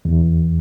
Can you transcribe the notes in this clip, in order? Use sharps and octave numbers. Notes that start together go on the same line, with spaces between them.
E2